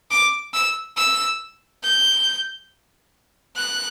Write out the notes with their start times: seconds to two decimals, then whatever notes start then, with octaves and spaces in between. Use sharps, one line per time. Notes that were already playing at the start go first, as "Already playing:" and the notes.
0.11 D6
0.54 E6
0.97 E6
1.83 G6
3.56 F#6